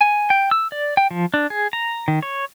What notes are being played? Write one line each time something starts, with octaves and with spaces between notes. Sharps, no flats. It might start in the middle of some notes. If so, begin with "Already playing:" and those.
G#5
G5
E6
D5
G5
F3
D4
G#4
A#5
D#3
C#5